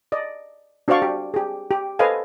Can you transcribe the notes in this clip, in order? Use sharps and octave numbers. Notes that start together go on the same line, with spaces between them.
D5 D#5
D4 F#4 C5 D5 F5 C#6
G4
G4 G#4
G4
A4 B4 C5 D#5 F5 G#5